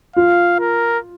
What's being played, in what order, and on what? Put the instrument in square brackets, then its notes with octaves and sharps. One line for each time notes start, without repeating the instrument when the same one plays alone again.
[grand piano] F4 [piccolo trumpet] F5
[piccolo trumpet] A#4